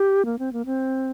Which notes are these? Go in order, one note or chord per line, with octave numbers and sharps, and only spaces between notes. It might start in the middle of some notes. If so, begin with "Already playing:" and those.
Already playing: G4
A#3
C4
A#3
C4